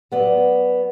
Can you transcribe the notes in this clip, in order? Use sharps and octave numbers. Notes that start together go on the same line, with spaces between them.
F#3 B3 D5